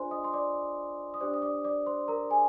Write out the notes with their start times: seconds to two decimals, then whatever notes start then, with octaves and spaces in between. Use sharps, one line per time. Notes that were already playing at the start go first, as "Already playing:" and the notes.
Already playing: D4 F4 G#4 C5 D5 G#5 C6
0.11 D#5 D#6
0.24 C6
0.33 D5 D6
1.14 D#6
1.20 D4 G4 C5 D5 D6
1.34 D#6
1.42 D5 D6
1.64 D5 D6
1.86 C5 C6
2.08 A#4 A#5
2.30 G#4 G#5